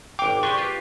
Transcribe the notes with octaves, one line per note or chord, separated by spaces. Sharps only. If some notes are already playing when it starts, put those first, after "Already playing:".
G#1 F5 G5 D6
D4 G4 G#4 C5 C6 C#6
F4 G4 B4 F5